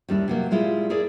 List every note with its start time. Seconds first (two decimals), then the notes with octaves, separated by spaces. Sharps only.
0.09 D#2 G3 D4 E4
0.28 C3 F#3 A#3
0.51 A#2 G3 G#3 E4 F4
0.90 E4 G#4 A#4 D5